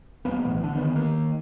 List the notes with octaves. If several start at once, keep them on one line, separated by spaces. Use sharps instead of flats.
C#2 F#3 A#3 B3
B1 A2 E3 B3
D3 D4
D3 D#3 B3
D#3 A#3